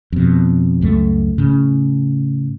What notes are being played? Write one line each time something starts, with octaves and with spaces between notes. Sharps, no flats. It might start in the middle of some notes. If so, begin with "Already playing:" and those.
F2 B2
C#2 F#2 F#3 A3
A2 C#3